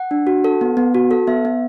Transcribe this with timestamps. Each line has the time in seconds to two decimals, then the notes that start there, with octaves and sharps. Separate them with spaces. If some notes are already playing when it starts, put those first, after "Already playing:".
Already playing: F#5
0.11 D4
0.27 F#4
0.44 A4
0.61 B3
0.77 B3
0.95 F#4
1.11 A4
1.27 B3 E5
1.45 B3